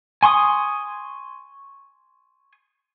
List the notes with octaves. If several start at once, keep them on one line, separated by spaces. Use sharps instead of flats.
G#5 C6 C#6 D#6